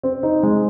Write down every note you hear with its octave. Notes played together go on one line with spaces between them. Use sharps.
C4
D#4
G#3